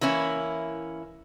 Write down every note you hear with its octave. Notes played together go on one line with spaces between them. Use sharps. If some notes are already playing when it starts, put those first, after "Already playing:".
E3 A#3 C#4 E4